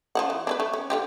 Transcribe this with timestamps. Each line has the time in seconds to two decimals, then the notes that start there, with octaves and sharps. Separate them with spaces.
0.15 F3 C#4 F#5
0.30 E3
0.47 D4 E4 B4
0.60 A3
0.74 C#4
0.90 D3 F4 G4